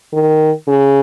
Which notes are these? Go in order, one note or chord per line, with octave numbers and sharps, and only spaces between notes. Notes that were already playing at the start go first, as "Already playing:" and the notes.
D#3
C#3